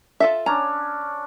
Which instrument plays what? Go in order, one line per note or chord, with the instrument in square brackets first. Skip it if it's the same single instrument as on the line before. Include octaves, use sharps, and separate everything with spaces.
[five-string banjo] F4 A4 E5
[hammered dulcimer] C#4 D4 [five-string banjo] A#5